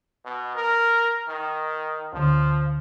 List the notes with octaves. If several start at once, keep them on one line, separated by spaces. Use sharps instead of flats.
B2
A#4
D#3
D2 D3 F3